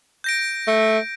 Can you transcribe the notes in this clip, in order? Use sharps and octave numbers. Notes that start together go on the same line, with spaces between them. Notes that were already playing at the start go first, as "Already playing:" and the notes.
G6 A#6 D7
A3